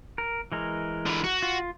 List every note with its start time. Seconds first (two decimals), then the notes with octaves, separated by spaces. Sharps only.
0.18 A#4
0.52 E3 G#3 A#4
1.06 D3 B4
1.24 F#4
1.42 F4